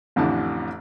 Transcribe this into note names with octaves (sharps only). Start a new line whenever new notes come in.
A1 F2 D3 E3 A5